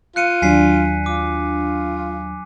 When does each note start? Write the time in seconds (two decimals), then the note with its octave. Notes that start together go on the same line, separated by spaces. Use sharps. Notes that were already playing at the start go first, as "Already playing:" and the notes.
0.16 F4 F#6 C#7 D#7
0.42 D#2 F#3 D4 G#5 B6 C7
1.06 F4 D6